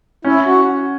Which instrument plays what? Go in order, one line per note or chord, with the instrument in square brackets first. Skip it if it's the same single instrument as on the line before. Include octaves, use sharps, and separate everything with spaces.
[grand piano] C#4 [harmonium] E4
[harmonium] F#4